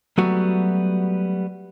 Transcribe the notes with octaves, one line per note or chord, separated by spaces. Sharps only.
F#3 G3 A3 B3 F#4